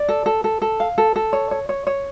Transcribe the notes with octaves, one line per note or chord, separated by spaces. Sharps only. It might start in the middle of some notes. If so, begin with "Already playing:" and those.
Already playing: D5
A4
A4
A4
A4
F5
A4
A4
C#5
C#5
C#5
C#5